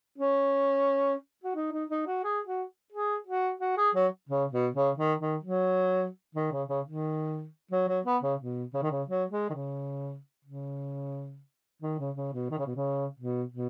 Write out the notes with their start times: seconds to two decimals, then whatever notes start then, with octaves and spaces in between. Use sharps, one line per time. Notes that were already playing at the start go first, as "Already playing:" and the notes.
0.18 C#4
1.44 F#4
1.55 D#4
1.73 D#4
1.90 D#4
2.07 F#4
2.24 G#4
2.47 F#4
2.93 G#4
3.27 F#4
3.60 F#4
3.78 G#4
3.95 F#3
4.29 C#3
4.52 B2
4.75 C#3
4.98 D#3
5.20 D#3
5.43 F#3
6.35 D#3
6.52 C#3
6.68 C#3
6.86 D#3
7.71 F#3
7.88 F#3
8.06 B3
8.23 C#3
8.40 B2
8.74 C#3
8.82 D#3
8.91 C#3
9.08 F#3
9.31 G#3
9.50 D#3
9.54 C#3
10.45 C#3
11.82 D#3
11.99 C#3
12.17 C#3
12.33 B2
12.50 D#3
12.58 C#3
12.66 B2
12.76 C#3
13.19 B2
13.53 B2